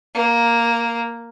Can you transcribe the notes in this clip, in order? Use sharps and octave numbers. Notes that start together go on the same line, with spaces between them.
A#3